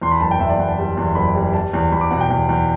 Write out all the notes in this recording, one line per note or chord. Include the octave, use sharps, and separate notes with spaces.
E2 C6
B5
F#1 A5
G5
E2 E5
D5
E2 F#5
A5
G3
E2
F#1 B5
G3
G3 A5
E2
E2 B5
D6
B2 F#5
G5
E2
E2